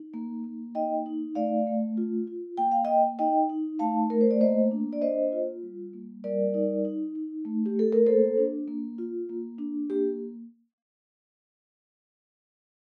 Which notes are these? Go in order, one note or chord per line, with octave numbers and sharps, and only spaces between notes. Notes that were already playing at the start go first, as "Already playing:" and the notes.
Already playing: D#4
A#3
A#3
D#4 D#5 G5
D#4
A3 D5 F5
A3
F4
F4
A#3 G5
F5
A#3 D#5 G5
D#4 D#5 G5
D#4
A3 F5 A5
A3 A#4
C5
D5
A#3 C5 D#5
D4
D5
A#3 C5 D#5
F4
G3
A#3
G3 A#4 D5
D#4
D#4
D#4
A3
G4
A3 A4
A#4
A#3 A4 C5
D4
A#3
F4
A#3
D4
A#3 G4